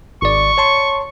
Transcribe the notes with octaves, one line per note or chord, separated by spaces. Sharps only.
G#1 D5 C#6
C#5 A5 C6